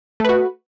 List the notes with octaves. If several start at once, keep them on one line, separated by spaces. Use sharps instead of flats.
A3 F#4 B4